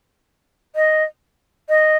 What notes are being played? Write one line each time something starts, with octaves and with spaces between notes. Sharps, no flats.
D#5
D#5